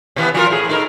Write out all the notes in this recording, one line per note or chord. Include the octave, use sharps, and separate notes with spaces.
B2 E3 B3
F3 F4 A#4
A2 G#4
A2 D#4 A#4